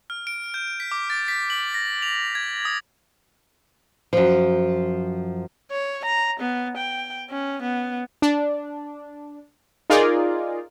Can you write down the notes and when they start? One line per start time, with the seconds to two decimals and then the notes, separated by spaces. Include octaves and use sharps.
0.10 F6
0.27 D7
0.54 G6
0.80 B6
0.92 D6
1.10 A6
1.28 B6
1.50 F#7
1.74 A#6
2.02 F7
2.35 G#6
2.65 D#6
4.13 F#2 F3
5.71 C#5
6.05 A#5
6.40 B3
6.77 G5
7.30 C#4
7.62 B3
8.22 D4
9.90 D#4 F4 G#4 A#4 D5